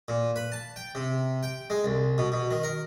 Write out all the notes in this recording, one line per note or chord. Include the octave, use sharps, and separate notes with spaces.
A#2
B4
A5
G5
C3
G5
G#3
C2
B2
B2
D#3
A#4